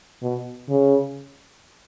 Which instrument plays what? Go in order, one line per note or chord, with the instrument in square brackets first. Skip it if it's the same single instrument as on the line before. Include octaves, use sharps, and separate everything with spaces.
[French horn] B2
C#3